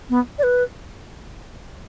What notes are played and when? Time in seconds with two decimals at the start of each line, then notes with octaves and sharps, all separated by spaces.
0.10 B3
0.39 D5
0.43 B4